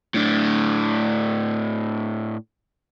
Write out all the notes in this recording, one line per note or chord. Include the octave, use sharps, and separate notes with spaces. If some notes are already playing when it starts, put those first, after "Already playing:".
A2 D4